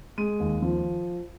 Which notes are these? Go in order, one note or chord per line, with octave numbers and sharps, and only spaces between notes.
G#3 D#7
D#2
F3